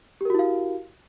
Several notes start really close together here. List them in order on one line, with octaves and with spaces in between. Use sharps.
G4 A#4 F#4 E4 F5